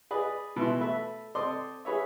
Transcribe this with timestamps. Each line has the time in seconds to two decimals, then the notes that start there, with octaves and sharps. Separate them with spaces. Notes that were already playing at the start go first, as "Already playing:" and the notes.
0.11 G#4 B4 D5 D#5
0.56 B2 E3 E4 C6
0.80 A3 B4 E5
1.35 C4 A4 D5 D#5 C6 D6
1.85 G#4 B4 C#5 E5